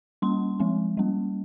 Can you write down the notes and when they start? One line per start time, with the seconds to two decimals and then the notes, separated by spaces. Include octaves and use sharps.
0.22 G3 A#3 C#4 C6
0.60 F3 G#3 C4
0.97 G3 A#3 C#4